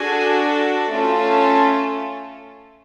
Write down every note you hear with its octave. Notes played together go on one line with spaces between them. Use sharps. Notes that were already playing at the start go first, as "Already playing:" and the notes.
Already playing: D4 F#4 G#4 A4 G#5
A3 C#4 F4 A4